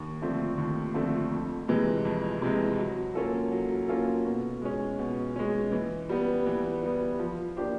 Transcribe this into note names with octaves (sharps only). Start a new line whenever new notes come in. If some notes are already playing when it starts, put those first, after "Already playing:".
Already playing: D#2
D3 F3 A3 C4
D#2
D3 F3 A3 C4
F2
C3 E3 G#3
F2
C3 E3 G#3
F#3
A#3 C#4 F4 A4
F#3
A#3 C#4 F4 A4
B2
G#3 C#4
B2
G#3 C#4
E3
G3 B3
E3
G3 B3
F3
A#3 D4 G4 C5